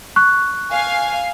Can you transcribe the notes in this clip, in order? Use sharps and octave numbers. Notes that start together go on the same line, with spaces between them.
C#6 F#6
F5 G#5